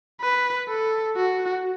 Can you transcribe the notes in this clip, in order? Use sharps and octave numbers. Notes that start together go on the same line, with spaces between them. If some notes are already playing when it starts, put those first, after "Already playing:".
B4
A4
F#4